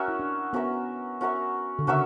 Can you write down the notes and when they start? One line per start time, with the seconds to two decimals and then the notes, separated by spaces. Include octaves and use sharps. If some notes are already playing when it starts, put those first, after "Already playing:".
Already playing: C#4 F#4 A#4 E5
0.08 E4
0.19 D4
0.53 B3 C#4 F#4 A#4 E5
1.21 C#4 F#4 A#4 E5
1.79 D3
1.87 C#3 C#4 F#4 A#4 E5